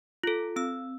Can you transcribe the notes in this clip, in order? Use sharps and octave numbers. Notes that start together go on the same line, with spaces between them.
F4 A4
C4 E6